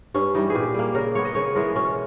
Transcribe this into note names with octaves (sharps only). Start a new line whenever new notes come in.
G2 C#4
E3 G3 D#4
G#4
A#2 G4
G3 A#3
C#3 A#4
G#3 B3 C#5
D#5
C#3 C#5
E3 G#3 B3 A#4
B2 C#4